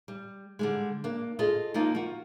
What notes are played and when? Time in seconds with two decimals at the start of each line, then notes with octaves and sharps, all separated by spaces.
0.08 G3
0.59 D3 G3 G#3
1.04 A#3 D4
1.39 F4 G#4 A4 D#5
1.74 F3 A#3 D#4 F4
1.95 F4 F#4